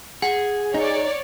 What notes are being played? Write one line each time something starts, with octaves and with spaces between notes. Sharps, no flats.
G#4 F#5
D#4 C#5 D5